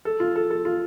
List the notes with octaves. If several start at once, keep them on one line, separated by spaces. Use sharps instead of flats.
A4
F4
A4
A4
F4